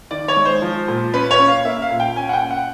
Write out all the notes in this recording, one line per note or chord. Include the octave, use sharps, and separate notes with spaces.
D#3 D5
C#5
G#3
C5
F3
A#2
C#4 B4
C#5
C#4
F5
A#3 E5
F5
A#2
G5
C#4 G#5
F#5
G5
C#4
F#5